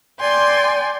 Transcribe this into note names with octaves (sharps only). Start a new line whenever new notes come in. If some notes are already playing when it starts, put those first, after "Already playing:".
D5 G5 G#5 C6